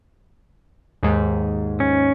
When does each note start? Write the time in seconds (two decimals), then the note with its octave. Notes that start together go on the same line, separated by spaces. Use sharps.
1.03 D#2 G#2
1.80 C#4